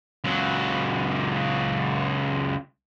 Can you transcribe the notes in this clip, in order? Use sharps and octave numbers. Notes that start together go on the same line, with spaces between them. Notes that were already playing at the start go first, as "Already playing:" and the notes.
C#2 F#3